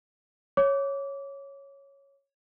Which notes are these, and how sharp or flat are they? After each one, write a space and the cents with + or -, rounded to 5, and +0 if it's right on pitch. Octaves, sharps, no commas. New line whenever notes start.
C#5 -5 D6 -25